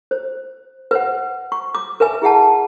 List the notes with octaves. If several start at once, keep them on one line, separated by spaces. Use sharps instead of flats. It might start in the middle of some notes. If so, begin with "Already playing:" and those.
C5
B4 C5 F#5
C#6
D6
A#4 B4 E5 G#5
E4 G#4 E5 F#5 A5